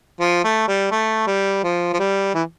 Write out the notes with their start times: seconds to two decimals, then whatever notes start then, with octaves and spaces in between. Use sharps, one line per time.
0.20 F3
0.44 A3
0.68 G3
0.91 A3
1.27 G3
1.64 F3
1.93 F3
1.99 G3
2.35 E3